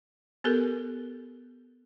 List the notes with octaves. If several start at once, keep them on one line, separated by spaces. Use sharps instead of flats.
B3 G4 A4 A#4